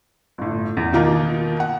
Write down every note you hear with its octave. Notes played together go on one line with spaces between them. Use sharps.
G1 A2
E2
B2 D#3 A#3 D#4 F4 A#4
F#5